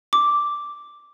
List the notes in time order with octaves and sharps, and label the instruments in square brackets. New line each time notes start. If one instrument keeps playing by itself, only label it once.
[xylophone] D6